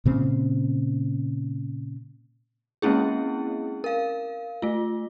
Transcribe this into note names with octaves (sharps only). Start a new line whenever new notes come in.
A#2 C#3 C4
G#3 A#3 C4 C#4 E4 G#4
A#4 F5
A3 F4